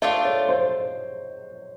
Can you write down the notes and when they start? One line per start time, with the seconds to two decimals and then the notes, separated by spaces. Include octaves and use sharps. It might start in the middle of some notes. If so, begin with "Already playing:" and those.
0.02 A3 D4 F4 D#5
0.25 C#5
0.49 C5